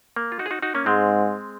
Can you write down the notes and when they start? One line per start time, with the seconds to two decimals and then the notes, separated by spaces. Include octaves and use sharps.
0.16 A#3
0.32 F4
0.39 D#4 F#4
0.46 G#4
0.51 D#4 F#4
0.62 D#4 F#4
0.75 A#3 C#4
0.86 G#2 G#3 C4